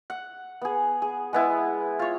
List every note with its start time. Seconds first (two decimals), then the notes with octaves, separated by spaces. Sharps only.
0.10 F#5
0.62 B3 G#4
1.02 G#4
1.33 G#3 B3 E4
1.99 F4 C#5